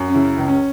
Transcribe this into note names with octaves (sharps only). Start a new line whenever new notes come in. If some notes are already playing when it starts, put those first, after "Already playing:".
Already playing: F#2
C#4
C#3 E4
C#2
C#4